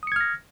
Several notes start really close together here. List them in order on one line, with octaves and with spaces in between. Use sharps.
D#6 C#7 G#6 F6 A#6